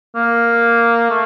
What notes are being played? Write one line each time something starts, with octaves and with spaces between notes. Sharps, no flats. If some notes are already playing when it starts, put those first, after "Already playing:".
A#3
A3